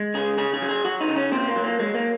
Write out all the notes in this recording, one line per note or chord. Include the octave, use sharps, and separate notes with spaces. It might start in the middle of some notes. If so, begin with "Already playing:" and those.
Already playing: G#3
C#3 G#4
C#3 G#4
G#4
F#3
G#4
F#3 F#4
D#4
C#3
C#4
A#2 C4
A#3
F#3
A#3
F#3 G#3
A#3